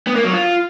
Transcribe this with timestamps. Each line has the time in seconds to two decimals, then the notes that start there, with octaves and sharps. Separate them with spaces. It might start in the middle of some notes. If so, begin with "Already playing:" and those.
0.07 B3
0.16 A#3
0.24 F#3
0.33 F4